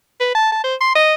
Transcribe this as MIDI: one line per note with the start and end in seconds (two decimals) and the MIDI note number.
0.20 0.32 71
0.35 0.51 81
0.52 0.62 81
0.64 0.75 72
0.81 0.93 84
0.95 1.14 75